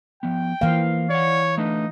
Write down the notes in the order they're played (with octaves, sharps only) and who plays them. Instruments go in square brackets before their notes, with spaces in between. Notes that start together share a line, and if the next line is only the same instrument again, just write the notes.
[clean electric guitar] F3 B3 [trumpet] G5
[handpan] E3 F5 [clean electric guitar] A#3 A#4 C5
[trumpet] C#5 [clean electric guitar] D5 F#5
[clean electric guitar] A3 D4 B4 [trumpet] D#4